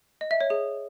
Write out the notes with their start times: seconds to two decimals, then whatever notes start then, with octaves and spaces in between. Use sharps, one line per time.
0.21 D#5
0.31 E5
0.41 C#5
0.50 G#4